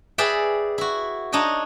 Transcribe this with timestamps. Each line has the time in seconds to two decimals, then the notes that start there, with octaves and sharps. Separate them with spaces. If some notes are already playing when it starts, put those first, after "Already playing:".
0.18 G#4 B4 D5 E5 G5
0.78 E4 F#4
1.32 D4 D#4 C#5 D#5 G5